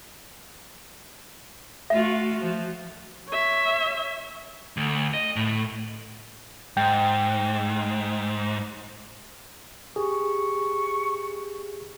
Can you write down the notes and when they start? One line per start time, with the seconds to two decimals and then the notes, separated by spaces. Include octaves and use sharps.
1.90 A3 F4 F#4 E5
2.42 F3 F#4
3.29 C#5 E5
4.77 D2
5.14 D#5
5.36 A2
6.77 G#2 G5
9.96 G4 G#4 C#6